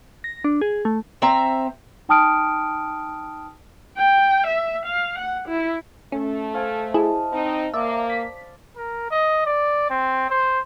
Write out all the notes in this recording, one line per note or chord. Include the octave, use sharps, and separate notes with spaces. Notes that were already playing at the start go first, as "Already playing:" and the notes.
A#6
D4
G#4
A3
C4 E5 A#5
D#4 G5 A5 D#6 F6 D7
G5
E5
F5
F#5
E4
A3 C#4
C5 F5 G#5
E4 G#4 D#5 A5
C4 D#4
A#3 D5 E5
B6
A#4
D#5
D5
C4
C5